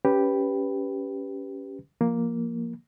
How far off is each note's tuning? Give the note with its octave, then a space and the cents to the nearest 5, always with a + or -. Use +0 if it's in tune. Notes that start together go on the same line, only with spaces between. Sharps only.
C#4 +10 G4 +0 B4 +0
F3 -15 A#3 +0